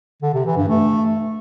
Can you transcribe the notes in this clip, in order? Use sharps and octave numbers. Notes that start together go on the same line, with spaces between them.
D3
C3
E3
G2
A3